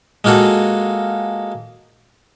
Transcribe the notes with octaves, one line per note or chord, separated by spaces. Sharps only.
G#3 A#3 F4 F#4 A4